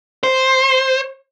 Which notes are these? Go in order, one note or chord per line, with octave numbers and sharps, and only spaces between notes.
C5